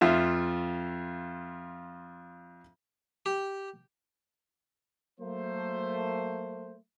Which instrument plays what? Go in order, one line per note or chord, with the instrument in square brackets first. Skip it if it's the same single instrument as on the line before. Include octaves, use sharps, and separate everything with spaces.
[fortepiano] F2 F4 E5
[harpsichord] G4
[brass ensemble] F#3 A3 A#3 C5